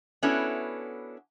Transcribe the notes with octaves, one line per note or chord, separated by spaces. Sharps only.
B3 C#4 D4 E4 F#4 A4